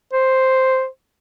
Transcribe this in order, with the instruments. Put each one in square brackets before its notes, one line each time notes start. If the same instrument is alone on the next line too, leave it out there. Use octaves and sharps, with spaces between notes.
[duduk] C5